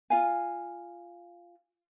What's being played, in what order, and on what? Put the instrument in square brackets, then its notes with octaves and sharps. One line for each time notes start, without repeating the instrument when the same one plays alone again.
[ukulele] F4 F5 G#5